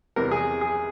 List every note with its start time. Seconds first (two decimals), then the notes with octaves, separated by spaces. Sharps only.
0.16 E2 C3 E3 G3 A#4
0.31 G#4
0.61 G#4